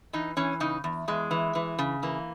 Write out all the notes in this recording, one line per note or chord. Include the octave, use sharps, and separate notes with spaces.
E3 D#4
E3 C#4
C#3 D#4
E2
E2 G#3
E3
E3
C#3
E3 A#3